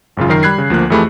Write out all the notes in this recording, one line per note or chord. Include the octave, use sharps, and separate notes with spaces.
G#1 F#2 C#3 F4
F#2 D#3 A#4 C7
G3 B5 F#6 G#6 C7
C#3
D2 F3 A#3 F#6
F2 E3 A3 G4 G#4 B5